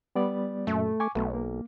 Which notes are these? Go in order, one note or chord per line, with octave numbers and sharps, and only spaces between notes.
G3 B3 D5
F#2 A#2 A3
G#5 C#6 D6
B1 F#3 A3 B3
A#3